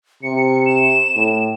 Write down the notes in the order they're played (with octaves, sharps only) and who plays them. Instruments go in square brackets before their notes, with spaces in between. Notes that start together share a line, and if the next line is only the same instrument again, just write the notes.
[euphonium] C3 [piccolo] C#7
[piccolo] E7
[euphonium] A2